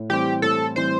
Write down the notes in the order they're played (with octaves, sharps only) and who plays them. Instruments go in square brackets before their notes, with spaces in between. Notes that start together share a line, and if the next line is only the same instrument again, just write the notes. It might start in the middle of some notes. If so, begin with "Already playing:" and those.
Already playing: [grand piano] A2
[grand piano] E3 G3 C4 [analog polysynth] G4
[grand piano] A2 [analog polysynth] A4
[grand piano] E3 G3 C4 [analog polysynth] C5